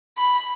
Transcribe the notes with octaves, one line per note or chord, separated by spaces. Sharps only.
B5